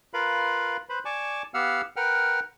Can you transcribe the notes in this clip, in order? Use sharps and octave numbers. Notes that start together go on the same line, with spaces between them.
F4 A#4 B4 F5 B5
B4 C5 B5
D5 G#5 A5 C#6 D6
B3 G4 F5 F#5 E6 F6
A#4 B4 F#5 G5 F6